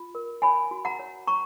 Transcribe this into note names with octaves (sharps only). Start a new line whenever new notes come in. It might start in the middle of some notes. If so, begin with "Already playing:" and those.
Already playing: F4
A#4
C#5 G#5 B5
F#4
F#5 A#5
C#5
C#5 A#5 C#6